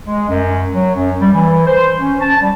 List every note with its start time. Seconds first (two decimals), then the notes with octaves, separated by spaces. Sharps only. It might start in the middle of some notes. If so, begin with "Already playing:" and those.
0.07 G#3
0.28 F#2
0.74 F#3
0.95 F#2
1.21 G3
1.33 E3
1.66 C5
1.98 C#4
2.21 A5
2.40 G3